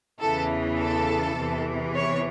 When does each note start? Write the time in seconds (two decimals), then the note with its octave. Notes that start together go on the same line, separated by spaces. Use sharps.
0.20 E2 C#3 E3 A4
0.78 A4
1.37 E2 C3 E3
1.95 C#5